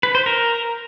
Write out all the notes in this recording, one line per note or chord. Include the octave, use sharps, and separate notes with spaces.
B4
C5
A#4